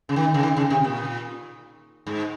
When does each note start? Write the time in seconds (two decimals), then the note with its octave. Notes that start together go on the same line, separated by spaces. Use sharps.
0.09 C#3
0.16 D#3
0.34 C#3
0.43 D#3
0.57 C#3
0.70 C3
0.84 A#2
2.07 G#2